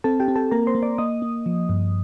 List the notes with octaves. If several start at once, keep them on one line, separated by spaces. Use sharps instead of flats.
C4 A4 A5
G4 G5
C4
A4 A5
A#3 A#4 A#5
C5 C6
A#3
D5 D6
A#3 D#5 D#6
A#3
F3
G2